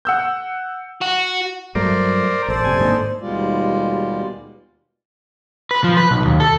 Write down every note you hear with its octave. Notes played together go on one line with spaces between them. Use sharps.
F#5 E6 G6
F#4
G2 F#3 A3 A#4 C5 D5
A1 A4 C5 D5
F#1 C3 G#5
G#2 D#3 A#3 D4
D#2 B2 G3 G#3 F4 D5
B4
F3
B4
B1
D#2
A4